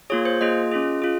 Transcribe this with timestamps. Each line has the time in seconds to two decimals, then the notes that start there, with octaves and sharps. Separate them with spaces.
0.10 A#3 F4 G#4 C#5
0.25 C5
0.41 A#3 F4 G#4 D#5
0.72 C#4 F4 G#4
1.02 F4 G#4